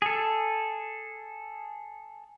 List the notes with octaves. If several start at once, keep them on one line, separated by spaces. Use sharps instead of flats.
G#4 A4